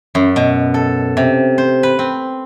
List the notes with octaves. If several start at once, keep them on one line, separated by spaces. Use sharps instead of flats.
F#2
B2
A4
C3
C5
B4
C4